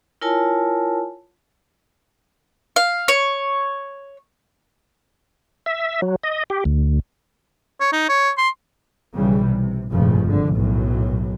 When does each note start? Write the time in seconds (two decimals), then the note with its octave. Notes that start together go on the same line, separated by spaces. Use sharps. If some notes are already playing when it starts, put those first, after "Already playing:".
0.21 E4 F4 A#4 C#5 G#5 A5
2.76 F5
3.08 C#5
5.66 E5
6.02 F#3
6.23 D#5
6.50 G4
6.65 D2
7.80 C#5
7.92 D#4
8.09 C#5
8.37 C6
9.15 B1 C#3 E3 G3
9.46 C3
9.91 F1 A#1 G2 C#3 F3
10.23 G#1 D3
10.53 B1 F#2 A2 F#3